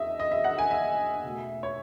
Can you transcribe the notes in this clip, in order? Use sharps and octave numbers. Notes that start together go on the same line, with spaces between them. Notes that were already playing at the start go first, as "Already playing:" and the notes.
Already playing: E2 D#5 E5
D#5
E5
F#5
G#5
E5
B2 A3
C#5